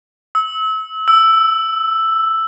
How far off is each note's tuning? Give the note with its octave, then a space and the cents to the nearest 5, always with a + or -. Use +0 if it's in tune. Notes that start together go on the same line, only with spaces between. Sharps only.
E6 -35
E6 +5